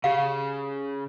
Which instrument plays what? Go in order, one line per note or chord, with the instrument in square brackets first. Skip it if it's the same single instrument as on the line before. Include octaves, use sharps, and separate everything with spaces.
[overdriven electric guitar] C#3 [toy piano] G4 F5